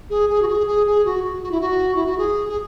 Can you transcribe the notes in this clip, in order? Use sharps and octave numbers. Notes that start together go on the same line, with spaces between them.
G#4
G#4
F#4
G#4
G#4
G#4
F#4
F#4
F#4
E4
F#4
E4
F#4
G#4
G#4